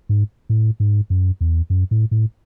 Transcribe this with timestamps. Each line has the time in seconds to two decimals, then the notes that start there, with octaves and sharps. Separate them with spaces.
0.09 G#2
0.49 A2
0.80 G#2
1.10 F#2
1.41 E2
1.70 F#2
1.91 A2
2.11 A2